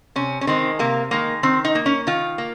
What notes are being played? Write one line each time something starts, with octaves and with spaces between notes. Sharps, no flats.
C3 C#4
C#4
D#3 G#3 C4
C3 A#3
D#3 G#3 A#3
D#3 C4
D#4
A#3
C#4
D#3 F4
A#3